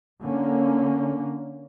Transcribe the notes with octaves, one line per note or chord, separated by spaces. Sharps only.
D3 A#3 C#4